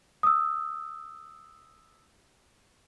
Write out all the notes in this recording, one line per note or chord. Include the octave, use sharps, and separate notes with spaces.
D#6 E6